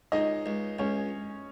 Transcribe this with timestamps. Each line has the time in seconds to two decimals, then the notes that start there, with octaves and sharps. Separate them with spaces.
0.12 C#2 D#4 D#5
0.46 C#2
0.79 C#2 C#4 C#5